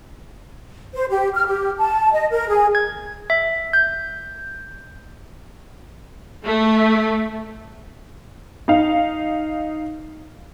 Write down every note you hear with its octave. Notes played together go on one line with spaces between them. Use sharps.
C5
G4
F6
G4
A5
D#5
A#4
G#4
G#6
E5
G6
A3
D#4 F5